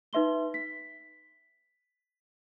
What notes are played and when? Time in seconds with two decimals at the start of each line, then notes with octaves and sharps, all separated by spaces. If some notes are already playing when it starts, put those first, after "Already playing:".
0.13 D#4 B4 E5 C6 G7
0.54 B6